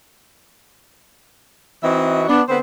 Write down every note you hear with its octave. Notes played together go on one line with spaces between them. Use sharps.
E3 C4 D#4 F#4 D#5 E5
B3 D4
D3 B3 C4 B4 C5